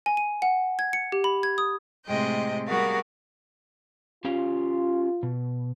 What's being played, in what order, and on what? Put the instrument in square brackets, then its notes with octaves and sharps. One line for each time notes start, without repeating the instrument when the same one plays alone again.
[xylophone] G#5
D#7
F#5
G#6
C#7
G4
B5
G#6
D#6
[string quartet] A2 C3 G#3 D#5 G5
G3 B3 F#4 G#4 A#4 F5
[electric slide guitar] C#4 G4 F5 [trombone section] F4
[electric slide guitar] B2